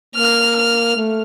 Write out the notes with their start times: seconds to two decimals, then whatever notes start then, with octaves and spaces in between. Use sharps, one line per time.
0.15 A#3 F6
0.56 F6
0.96 A3